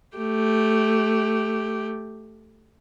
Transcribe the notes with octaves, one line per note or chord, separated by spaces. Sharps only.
A3 G4